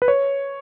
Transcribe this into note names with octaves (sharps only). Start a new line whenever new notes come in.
B4
C#5